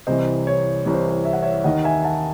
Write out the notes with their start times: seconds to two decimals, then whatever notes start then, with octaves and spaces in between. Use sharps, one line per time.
0.07 C2 C3 E3 C5 D#5
0.47 C#5
0.86 C2 C3 E3 C#5
0.94 C5
1.08 C5
1.25 E5
1.33 F#5
1.42 C#5 E5
1.64 D#2 D#3 D#5 F#5
1.84 E5 G#5
2.04 F#5 A5